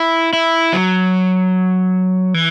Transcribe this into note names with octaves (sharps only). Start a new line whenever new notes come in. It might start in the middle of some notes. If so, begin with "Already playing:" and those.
Already playing: E4
E4
F#3
E3